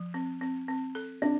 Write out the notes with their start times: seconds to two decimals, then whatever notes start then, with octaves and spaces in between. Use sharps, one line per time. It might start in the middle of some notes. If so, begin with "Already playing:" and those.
Already playing: F3
0.14 C4
0.41 C4
0.68 C4
0.95 A4
1.22 C4 D4